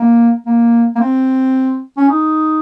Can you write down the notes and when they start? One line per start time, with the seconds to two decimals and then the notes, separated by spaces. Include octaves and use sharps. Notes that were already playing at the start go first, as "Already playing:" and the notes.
Already playing: A#3
0.46 A#3
0.96 A#3
1.00 C4
1.97 C#4
2.09 D#4